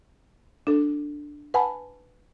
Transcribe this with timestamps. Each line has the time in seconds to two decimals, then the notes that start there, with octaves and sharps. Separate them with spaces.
0.67 D4 A4
1.54 B4 F#5 G#5 A5 B5